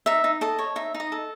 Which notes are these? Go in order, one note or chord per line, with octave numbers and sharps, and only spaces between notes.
D#4 E5
D#4
A4 D#5
C#5
D#4 E5
D#4
D#5
A4